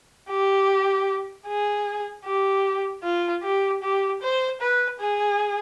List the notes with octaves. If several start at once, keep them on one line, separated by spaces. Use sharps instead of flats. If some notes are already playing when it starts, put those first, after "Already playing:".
G4
G#4
G4
F4
G4
G4
C5
B4
G#4